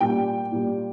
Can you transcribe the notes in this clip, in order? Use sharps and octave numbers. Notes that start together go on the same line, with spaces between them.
A#2 G3 G5
A#2 G3